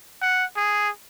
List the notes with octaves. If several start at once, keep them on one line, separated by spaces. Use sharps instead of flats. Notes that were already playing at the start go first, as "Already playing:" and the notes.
F#5
G#4